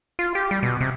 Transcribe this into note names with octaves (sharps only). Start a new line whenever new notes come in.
F4
G4
G3
B2
C3